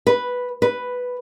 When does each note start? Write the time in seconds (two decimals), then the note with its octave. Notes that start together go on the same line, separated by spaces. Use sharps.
0.07 B4
0.62 B4